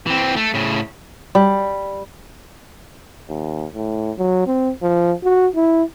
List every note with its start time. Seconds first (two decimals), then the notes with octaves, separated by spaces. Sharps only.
0.06 E3 C4
0.36 A3
0.54 A2 C#3
1.35 G3
3.29 D#2
3.75 A2
4.18 F#3
4.47 C4
4.82 F3
5.23 F#4
5.55 E4